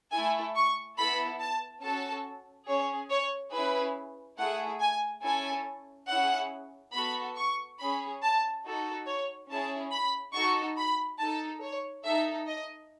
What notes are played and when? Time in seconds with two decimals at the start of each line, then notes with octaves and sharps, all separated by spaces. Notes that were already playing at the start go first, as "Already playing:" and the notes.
0.12 A3 E4 A4 G#5
0.55 C#6
0.98 B3 E4 A4 B5
1.40 A5
1.83 C#4 F#4 A4 A5
2.68 C#4 G#4 C#5
3.10 C#5
3.53 C#4 E4 G#4 B4
4.38 A3 E4 G#4 F#5
4.81 G#5
5.24 C#4 E4 A4 G#5
6.08 C#4 E4 G#4 F#5
6.93 B3 F#4 A4 B5
7.37 C#6
7.79 C#4 G#4 B5
8.22 A5
8.64 D#4 F#4 A4
9.06 C#5
9.50 C#4 E4 G#4 A5
9.92 B5
10.34 D#4 F#4 A4 C#6
10.77 B5
11.20 D#4 A4 A5
11.62 C#5
12.05 D#4 A4 E5
12.47 D#5